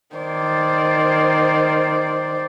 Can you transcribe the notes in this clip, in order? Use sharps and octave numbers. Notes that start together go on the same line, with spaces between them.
D#3 C5 D5